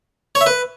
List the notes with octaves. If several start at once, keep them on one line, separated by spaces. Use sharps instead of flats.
C#5
E5
B4